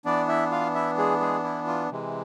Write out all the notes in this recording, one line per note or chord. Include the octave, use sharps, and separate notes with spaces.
E3 B3 D4 D5
E4 E5
F4 F5
E4 E5
G#3 G#4
G#3 G#4
E4
F4
C3 E3 G#3